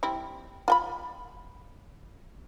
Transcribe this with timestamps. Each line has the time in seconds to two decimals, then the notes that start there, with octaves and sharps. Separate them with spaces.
0.03 G3 C4 E4
0.68 F4 G5 B5